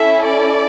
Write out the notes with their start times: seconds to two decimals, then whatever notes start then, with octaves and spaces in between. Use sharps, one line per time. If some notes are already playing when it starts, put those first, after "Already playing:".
Already playing: C#4 E4 A4 E5
0.25 D5